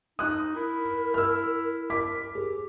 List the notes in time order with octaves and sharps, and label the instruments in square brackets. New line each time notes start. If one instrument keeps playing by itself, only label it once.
[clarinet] D#4 [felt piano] D#6 F#6
[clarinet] E4 [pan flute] A#4
[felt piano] E6 F6
[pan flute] A#4 [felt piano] D6 B6
[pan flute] G4 [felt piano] G#4